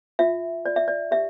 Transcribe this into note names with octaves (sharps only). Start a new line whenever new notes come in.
F4 E5
F4 D5
E5
D5
G4 E5